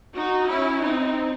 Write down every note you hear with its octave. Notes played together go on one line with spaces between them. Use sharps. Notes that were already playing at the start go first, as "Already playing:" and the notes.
D#4 F#4
C#4 E4
C4 D#4